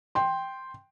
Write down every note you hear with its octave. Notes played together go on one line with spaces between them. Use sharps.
G5 C6